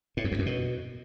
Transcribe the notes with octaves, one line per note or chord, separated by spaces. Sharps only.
A2
F2
E2
F#2
B2